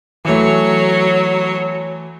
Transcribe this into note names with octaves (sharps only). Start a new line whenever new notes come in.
E3 F#3 A3 C#5